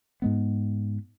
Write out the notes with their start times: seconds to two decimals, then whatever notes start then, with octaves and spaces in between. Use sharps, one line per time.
0.22 G#2 G#3 B3